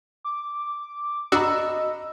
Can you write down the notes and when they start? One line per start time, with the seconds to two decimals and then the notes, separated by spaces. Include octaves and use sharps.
0.24 D6
1.32 D4 F#4 D#5 A#5 B5 E6